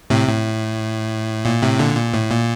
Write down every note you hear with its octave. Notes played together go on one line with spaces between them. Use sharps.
A2 C3
A2
A#2
A2 C3
A#2 D3
A#2
A2
A#2